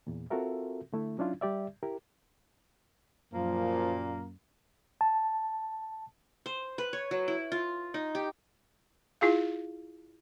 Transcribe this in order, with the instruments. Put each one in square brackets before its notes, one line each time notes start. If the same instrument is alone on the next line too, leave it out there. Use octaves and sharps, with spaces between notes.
[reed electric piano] E2 A#2
C4 F4 F#4 A4 A#4 E5
D3 A3 E4
F#3 C#4 D4 E4 F4
G3 G4 D5 E5
E4 G4 A#4
[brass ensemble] F#2 [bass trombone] A#2 [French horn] F3 [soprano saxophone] A#3
[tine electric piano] A5
[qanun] C5
B4
C#5
F#3
E4
F4
D#4
G4
[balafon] E4 F4 G#4 F5